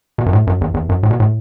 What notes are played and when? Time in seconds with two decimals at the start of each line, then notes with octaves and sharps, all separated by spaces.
0.18 B2
0.26 F#2
0.33 A2
0.47 F#2
0.61 E2
0.74 E2
0.89 F#2
1.03 A2
1.11 B2
1.20 A2